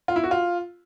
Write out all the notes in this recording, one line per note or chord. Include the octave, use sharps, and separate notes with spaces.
F4
E4
F#4
F4